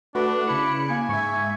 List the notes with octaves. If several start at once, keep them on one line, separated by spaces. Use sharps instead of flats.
A3 D4 F#4 B4
C#3 E4 B5 C#7
A#3 G#5
G#2 E5 C#6